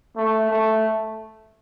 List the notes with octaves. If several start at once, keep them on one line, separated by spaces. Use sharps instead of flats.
A3
A3